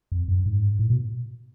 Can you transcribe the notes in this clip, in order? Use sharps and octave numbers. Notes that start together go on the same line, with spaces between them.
F2
F#2
G#2
A2
B2